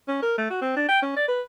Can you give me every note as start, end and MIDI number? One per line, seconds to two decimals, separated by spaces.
0.08 0.18 61
0.22 0.37 70
0.38 0.45 57
0.50 0.58 66
0.61 0.72 60
0.77 0.84 62
0.89 1.00 79
1.02 1.16 61
1.16 1.25 74
1.28 1.42 71